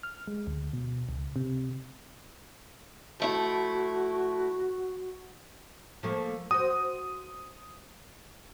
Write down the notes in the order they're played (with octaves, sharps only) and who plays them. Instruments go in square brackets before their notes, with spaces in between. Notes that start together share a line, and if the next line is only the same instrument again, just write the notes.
[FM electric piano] F6
G#3
D2
B2
C#2
C3
[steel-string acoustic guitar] F3 A3 E4 [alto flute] F#4
[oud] F3 A3 A#3
[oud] F#4 C5 [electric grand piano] D#6